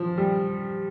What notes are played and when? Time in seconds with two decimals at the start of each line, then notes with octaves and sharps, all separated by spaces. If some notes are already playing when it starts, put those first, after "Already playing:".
Already playing: F3
0.18 G3